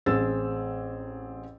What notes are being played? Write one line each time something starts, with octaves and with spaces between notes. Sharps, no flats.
A1 C4 G#4 E6 A6